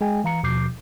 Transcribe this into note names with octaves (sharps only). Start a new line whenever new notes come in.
G#3 G#4 G5 G#5
E3 F5 A#5 C#7
D#2 B2 F3 D6 G6 C7